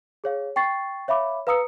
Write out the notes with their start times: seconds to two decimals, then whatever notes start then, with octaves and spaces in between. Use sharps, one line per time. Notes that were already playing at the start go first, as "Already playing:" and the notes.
0.24 G#4 C#5 F5
0.56 G5 C#6 A6 C7
1.08 C#5 E5 F5 B5 D6
1.47 B4 F5 A#5 D#6 E6 C#7